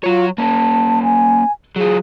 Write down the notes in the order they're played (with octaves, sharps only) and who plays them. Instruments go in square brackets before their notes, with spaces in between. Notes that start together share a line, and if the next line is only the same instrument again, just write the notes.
[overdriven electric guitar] F#3 C#5 [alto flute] F4
[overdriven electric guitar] A#3 C#4 [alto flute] A5
[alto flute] G#5
[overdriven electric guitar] F#3 F4 [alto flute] G#4